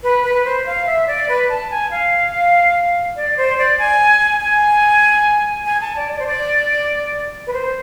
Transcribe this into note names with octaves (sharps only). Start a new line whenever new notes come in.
B4
B4
C5
F5
E5
D5
B4
A5
G#5
F5
D5
C5
D5
G#5
G#5
G#5
A5
D5
D5
C5
D5
B4
C5